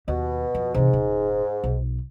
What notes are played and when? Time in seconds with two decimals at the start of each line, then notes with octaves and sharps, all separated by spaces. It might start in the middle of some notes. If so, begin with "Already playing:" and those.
0.08 D#2 B2
0.55 F2
0.74 G#2 C3 E3
0.93 D#1
1.64 B1